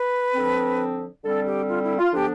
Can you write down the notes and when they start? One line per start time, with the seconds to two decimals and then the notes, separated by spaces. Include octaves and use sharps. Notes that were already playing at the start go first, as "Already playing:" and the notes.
Already playing: B4
0.34 D3 F3 C4
1.23 D3 G3 C4 A4
1.45 G4
1.68 F4
1.83 E4
1.98 F4
2.12 D3 F3 B3 D4 G4